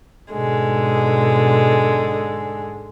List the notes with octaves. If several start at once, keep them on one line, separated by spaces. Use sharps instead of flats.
G#2 B2 D3 G#3